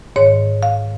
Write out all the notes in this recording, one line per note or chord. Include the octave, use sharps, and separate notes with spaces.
G#2 D#3 C#5
F5